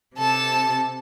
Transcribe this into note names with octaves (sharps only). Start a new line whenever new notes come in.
C3 A4 A5